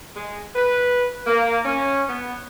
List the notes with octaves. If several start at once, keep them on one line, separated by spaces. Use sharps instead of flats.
G#3
B4
A#3
C#4
B3